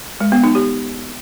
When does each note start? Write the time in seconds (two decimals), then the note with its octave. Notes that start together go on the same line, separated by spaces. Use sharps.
0.20 G#3
0.32 B3
0.44 D#4
0.55 G4